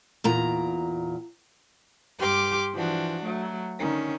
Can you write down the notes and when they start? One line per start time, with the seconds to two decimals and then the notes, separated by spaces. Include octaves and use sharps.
0.24 E2 A#2 A#5
2.19 G2 G4 C6 D6 F6
2.74 E3 F3 D4 F#4
3.23 F#3 A3
3.79 D3 D#3 C#4